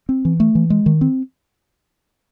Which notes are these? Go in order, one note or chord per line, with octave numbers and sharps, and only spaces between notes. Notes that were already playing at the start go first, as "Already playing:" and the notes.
C4
E3
A3
E3
G#3
D#3
C4